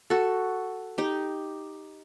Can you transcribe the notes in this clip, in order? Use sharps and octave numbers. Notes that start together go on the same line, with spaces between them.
F#4 A4
D#4 G4